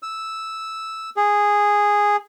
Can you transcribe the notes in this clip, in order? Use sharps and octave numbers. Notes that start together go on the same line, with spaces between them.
E6
G#4